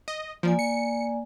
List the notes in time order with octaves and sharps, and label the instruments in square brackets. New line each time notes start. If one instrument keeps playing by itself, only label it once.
[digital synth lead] D#5
[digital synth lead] F3 [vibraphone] A#3 D5 G#5
[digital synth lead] C#7